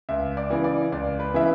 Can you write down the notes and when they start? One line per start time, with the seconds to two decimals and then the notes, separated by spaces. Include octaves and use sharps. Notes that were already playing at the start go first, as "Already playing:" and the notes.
0.09 C#2 E5
0.37 D5
0.50 C#3 E3
0.64 D5
0.92 C#2 D5
1.19 B4
1.34 C#3 E3 E5